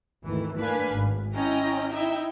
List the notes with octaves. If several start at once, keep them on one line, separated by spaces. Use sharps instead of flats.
G#1 D#2 E3 A3
A#3 D4 B4 F5 G#5
G#1
C#4 E4 D#5 G5 A#5
D#4 E4 E5 G5